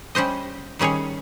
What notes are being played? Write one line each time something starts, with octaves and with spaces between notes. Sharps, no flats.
G3 C#4 G4 C5 D#5
D#3 G3 C#4 G#4 C#5